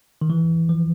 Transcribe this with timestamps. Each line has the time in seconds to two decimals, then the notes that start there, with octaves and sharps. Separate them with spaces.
0.21 D#3
0.30 E3
0.69 F3